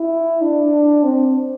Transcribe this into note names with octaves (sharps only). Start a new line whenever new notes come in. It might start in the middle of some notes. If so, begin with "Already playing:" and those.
Already playing: E4
D4
C4